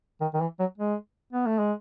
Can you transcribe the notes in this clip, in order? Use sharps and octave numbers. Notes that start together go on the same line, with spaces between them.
D#3
D#3
E3
F#3
G#3
B3
A3
G#3